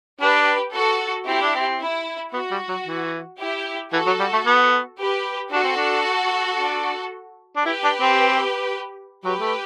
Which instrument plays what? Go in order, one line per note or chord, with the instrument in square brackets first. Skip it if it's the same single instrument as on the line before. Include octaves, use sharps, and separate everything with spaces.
[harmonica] D4 [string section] G4 B4
[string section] F#4 A4
[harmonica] C4 [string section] E4 G4
[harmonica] D4
C4
[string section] E4
[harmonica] B3 [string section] F#4
[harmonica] G3
F#3
E3
[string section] E4 G4
[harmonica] E3 [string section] F#4 A4
[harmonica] F#3
G3
A3
B3
[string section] G4 B4
[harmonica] D4 [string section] F#4 A4
[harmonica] C4
D4
D4
D4
[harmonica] E4 [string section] G4 B4
[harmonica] D4
C4
[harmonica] F#3 [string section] G4 B4
[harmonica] A3